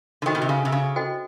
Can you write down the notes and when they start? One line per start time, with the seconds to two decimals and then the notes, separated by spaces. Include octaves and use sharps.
0.22 D3
0.26 D#3 F#4 A4 C5 D#5 G5
0.35 B2
0.42 C3
0.49 C#3
0.65 C3
0.72 C#3
0.96 F#4 A4 C5 D#5 G5